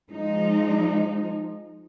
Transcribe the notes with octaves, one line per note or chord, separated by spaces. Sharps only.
F3 G#3 D#4